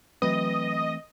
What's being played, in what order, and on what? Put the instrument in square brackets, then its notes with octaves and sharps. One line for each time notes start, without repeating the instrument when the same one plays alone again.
[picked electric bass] E3 A3 C4 [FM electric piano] F#3 B4 [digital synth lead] D#5